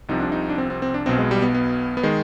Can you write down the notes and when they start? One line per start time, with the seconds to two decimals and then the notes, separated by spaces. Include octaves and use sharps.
0.09 C2 C3 F3 D#4
0.20 D4
0.32 D#4
0.49 D4
0.58 C4
0.70 C4
0.82 C4
0.94 D4
1.06 B1 B2 C4
1.18 G#3
1.31 G3
1.42 B3
1.55 B3
1.97 B3
2.03 D#3 G#3